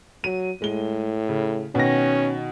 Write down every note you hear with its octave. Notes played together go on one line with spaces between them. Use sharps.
F#3 D#7
A2 G#3 G7
C#3
B2 D#3 C#4 A#6